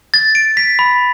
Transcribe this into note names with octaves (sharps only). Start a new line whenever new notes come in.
A6
D7
B6
B5